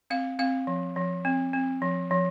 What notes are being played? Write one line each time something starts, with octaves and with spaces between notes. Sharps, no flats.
C4 F5
C4 F5
F3
F3
C4
C4
F3
F3